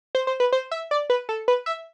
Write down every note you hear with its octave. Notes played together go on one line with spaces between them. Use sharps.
C5
C5
B4
C5
E5
D5
B4
A4
B4
E5